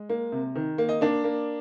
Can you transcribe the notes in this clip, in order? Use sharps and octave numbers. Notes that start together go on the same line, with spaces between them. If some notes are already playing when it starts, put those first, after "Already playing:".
Already playing: G#3
A#3
C3
D#3
A#3
D#5
A#3 D4 D5
A#3